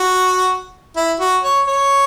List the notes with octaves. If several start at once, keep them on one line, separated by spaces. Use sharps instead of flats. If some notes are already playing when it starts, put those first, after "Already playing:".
Already playing: F#4
E4
F#4
C#5
C#5